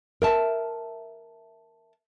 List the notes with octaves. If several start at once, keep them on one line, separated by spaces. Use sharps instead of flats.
A#4 E5 A5